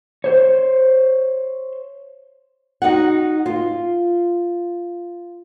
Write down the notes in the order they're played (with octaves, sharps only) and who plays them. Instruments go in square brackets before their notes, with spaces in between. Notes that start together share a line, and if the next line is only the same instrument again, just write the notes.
[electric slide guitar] C5 C#5
[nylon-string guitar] D#4 F#4 F#5
F4